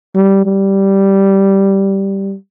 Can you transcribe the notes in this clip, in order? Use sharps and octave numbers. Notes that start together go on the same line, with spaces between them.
G3
G3